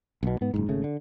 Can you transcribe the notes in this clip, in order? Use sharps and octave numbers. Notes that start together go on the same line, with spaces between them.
B1 B2
G#2 B3
F#1 C#2 G#2
G#1 C#3 A3
D3